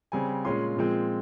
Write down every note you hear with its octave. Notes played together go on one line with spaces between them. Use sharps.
C#3 G3 C4 G#5
A#2 G#3 C#4 F4 C6
A#2 F3 G#3 C4